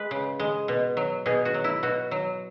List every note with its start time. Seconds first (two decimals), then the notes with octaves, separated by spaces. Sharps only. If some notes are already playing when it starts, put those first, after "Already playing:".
Already playing: G#3 B4
0.11 C#3
0.40 G#3
0.68 B2
0.97 F#3
1.26 B2 G#4
1.45 F#4
1.54 F#3
1.64 E4
1.83 B2 F#4
2.11 F#3